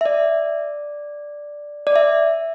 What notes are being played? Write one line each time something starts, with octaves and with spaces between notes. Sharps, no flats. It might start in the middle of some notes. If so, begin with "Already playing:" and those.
E5
D5
D5
E5